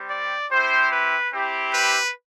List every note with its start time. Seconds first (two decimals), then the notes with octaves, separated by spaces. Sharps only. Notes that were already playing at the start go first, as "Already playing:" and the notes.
Already playing: G3 C4 G4
0.09 D5
0.50 C4 E4 G4 C5
0.91 B4
1.32 C4 E4 G4
1.73 B4